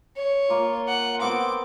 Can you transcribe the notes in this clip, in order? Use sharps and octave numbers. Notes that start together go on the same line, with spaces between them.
C#5
A#3 F4
F#5
B3 C4 F#5 D6